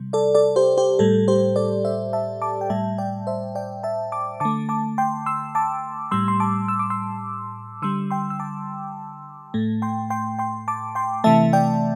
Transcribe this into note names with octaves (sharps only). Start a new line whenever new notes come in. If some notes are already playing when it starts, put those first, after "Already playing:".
Already playing: C3 G3
A4 D5
A4 D5
G4 C5
G4 C5
A2 G3 A4
G4 C5
A4 D5
C5 E5
E5 A5
A5 D6
G5
A2 G3 E5 A5
D5 G5
C5 E5
D5 G5
E5 A5
A5 D6
D3 A3 A5 D6
A5 D6
G5 C6
C6 E6
A5 D6
A2 G3 C6 E6
C6
A5 D6
E6
D6
C6 E6
D3 G3 C6 E6
G5 C6
E6
A5 D6
A2 A3
G5 C6
G5 C6
G5 C6
A5 D6
G5 C6
C3 E3 A3 E5 A5
D5 G5